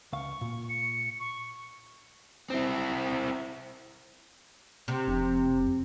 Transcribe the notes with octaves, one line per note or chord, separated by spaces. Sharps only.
C#2 F5 C#6
A#2
C#7
C#6
C4 E4
C3
F1